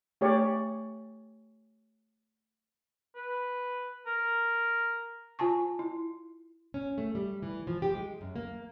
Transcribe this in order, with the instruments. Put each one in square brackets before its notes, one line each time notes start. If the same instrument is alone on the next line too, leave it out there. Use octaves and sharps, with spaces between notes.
[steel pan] A3 G4 C#5 D5
[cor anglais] B4
A#4
[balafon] F4 G#5 A5 C#6
E4
[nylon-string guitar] C#4
A3
G3
E3
F3
G4
G#3
F#2
A#3